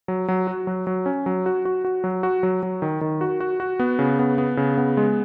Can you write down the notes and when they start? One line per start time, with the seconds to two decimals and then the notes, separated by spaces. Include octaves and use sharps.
0.08 F#3
0.28 F#3
0.47 F#4
0.67 F#3
0.87 F#3
1.06 C#4
1.26 F#3
1.46 F#4
1.65 F#4
1.85 F#4
2.04 F#3
2.23 F#4
2.43 F#3
2.63 F#3
2.82 D#3
3.01 D#3
3.21 F#4
3.40 F#4
3.60 F#4
3.79 B3
3.99 C#3
4.19 B3
4.38 B3
4.57 C#3
4.78 B3
4.97 G#3